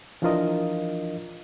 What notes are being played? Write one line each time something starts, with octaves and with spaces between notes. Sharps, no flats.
E3 F3 D4 F4 A#4 D#5